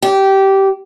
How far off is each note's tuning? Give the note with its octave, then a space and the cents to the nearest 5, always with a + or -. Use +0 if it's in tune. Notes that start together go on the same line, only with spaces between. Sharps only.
G4 -15